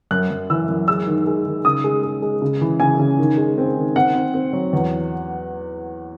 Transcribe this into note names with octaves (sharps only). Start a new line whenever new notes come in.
F#2 F#6
F#2
E3 E6
F#2
G#3 E6
D#3
G#3
D#3
C#3 D#6
G#3
G#3
G#3
C#3
E3
C#3 G#5
C#3
D#3
G#3
C4
D#3
C4 F#5
C4
C4
F#3
E2